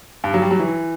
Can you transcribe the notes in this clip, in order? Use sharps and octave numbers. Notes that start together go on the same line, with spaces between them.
G2
F#3
G3
F#3
E3